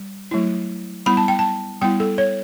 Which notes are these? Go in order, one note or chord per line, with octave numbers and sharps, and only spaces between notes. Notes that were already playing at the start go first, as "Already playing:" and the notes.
Already playing: G3
F#3 A3 E4
G3 B3 E4 B5
A5
G5
A5
G3 B3 E4 G5
A4
C#5